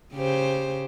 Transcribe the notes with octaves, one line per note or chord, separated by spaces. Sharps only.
C#3 G4 C5